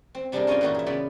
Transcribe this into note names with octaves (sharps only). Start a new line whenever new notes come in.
C4
C3 G3 D4 D#4 G#4 A#4
G2 C#4 F4 D#5 G5 G#5
A#2 E3 G3 D#4 F#4
G#4 E5
C#3 B3 D5 B5